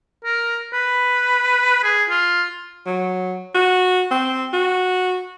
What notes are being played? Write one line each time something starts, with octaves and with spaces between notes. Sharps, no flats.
A#4
B4
G#4
F4
F#3
F#4
C4
F#4